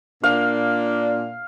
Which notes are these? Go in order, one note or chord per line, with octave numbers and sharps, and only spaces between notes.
A#2 A#3 D4 F5